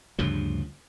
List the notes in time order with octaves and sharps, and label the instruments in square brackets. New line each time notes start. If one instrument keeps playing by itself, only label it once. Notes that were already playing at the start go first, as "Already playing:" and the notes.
[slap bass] D2 G2 C#3 F3